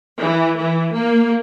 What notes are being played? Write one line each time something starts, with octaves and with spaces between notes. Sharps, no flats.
E3
E3
A#3